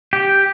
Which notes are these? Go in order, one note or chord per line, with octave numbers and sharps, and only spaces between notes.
G4